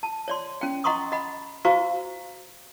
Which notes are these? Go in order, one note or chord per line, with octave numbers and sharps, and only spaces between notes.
A5
C#5 D5 C6
C#4 G5
D#5 F#5 A#5 C6 C#6 D#6
D#5 F#5 B5
F#4 C5 F5 A#5 C#6